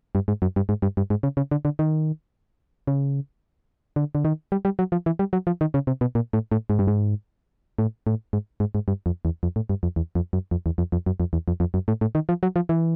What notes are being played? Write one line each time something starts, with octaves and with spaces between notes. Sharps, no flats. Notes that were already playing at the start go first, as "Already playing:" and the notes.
G2
G#2
F#2
G2
G#2
G2
G2
G#2
C#3
C#3
D3
D3
D#3
C#3
D3
D3
D#3
G3
G3
F#3
F3
E3
G3
F#3
F3
D#3
C#3
C3
B2
A#2
A2
A2
G#2
G2
G#2
A2
A2
G#2
G#2
G#2
G2
F2
E2
F2
A2
G2
F2
E2
F2
F#2
F2
E2
F2
F2
F#2
F2
E2
F2
F2
F#2
A2
A2
D#3
F3
F#3
F3
E3